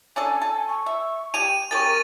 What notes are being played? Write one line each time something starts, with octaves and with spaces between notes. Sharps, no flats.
C#4 D4 A4 G#5
A4
C#6
E5
G4 G5 G#5 D#7 F7
C#4 G4 G#4 A#4 C#6 A6